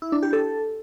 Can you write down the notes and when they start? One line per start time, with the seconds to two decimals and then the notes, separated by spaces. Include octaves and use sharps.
0.02 E4
0.12 D4
0.23 G4
0.33 A4